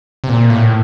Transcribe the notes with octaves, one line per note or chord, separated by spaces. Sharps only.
C3
A#2
A2